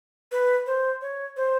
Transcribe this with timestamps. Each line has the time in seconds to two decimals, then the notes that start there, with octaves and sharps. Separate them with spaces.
0.32 B4
0.66 C5
1.02 C#5
1.37 C5